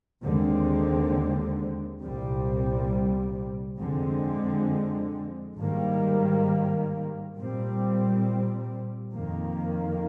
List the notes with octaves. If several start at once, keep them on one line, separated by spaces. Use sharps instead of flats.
D#2 D3 G#3 C4
C2 A#2 G3 C4
F2 D3 G#3 C4
G#2 D#3 G3 A#3
A#2 G3 C4
F2 D#3 A#3